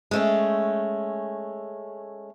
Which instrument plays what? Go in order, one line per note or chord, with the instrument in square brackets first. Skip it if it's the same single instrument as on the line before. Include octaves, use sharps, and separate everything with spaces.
[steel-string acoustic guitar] G#3 A3 C#4